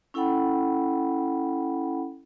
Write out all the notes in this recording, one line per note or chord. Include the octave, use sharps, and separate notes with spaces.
C#4 E4 A4 F#5 G5 B5